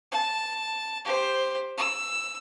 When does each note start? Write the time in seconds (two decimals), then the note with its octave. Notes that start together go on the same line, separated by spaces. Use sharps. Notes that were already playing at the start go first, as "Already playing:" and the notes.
0.12 A5
1.05 G4 C5
1.78 E6